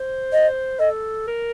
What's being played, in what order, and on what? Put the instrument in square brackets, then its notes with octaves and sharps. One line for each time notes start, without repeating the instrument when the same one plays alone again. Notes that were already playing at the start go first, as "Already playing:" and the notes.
Already playing: [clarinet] C5
[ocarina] D#5
[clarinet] A4 [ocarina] D#5
[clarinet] A#4